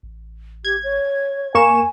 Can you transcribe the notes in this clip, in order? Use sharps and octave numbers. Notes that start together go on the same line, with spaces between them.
A1
G4 G#6
C#5
F2 A#3 G#5 C#6 E7